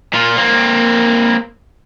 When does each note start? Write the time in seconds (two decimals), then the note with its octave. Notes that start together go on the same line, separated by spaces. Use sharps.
0.13 A#2 F4
0.37 A#3 C4